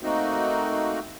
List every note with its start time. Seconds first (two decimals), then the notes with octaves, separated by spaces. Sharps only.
0.03 A3 A#3 C4 D#4 F#4